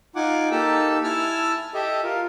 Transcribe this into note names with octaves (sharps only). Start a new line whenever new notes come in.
D#4 F4 F#5 G#5 D6
A#3 D#4 G4 A4 A5 E6
E4 G#5 A5 E6 F6
G4 A4 D#5 E5
F4 A#4